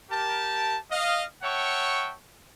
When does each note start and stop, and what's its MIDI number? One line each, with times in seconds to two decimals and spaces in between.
0.10 0.77 67
0.10 0.77 70
0.10 0.77 81
0.91 1.24 75
0.91 1.24 77
1.43 2.14 73
1.43 2.14 76
1.43 2.14 78
1.43 2.14 79
1.43 2.14 81
1.43 2.14 85